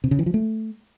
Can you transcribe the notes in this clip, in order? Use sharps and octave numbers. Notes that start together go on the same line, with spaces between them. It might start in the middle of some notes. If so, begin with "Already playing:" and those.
C3
C#3
E3
F3
A3